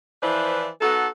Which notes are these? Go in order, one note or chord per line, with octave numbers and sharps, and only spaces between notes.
E3 F3 E4 B4 C5 D5
B3 D#4 F#4 A4